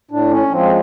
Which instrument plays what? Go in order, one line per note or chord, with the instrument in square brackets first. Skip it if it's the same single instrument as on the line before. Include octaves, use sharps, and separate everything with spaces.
[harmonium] A2 D4
C#4
F3 G#3 C4